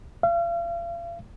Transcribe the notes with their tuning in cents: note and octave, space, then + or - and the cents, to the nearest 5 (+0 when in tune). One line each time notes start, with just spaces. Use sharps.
F5 -40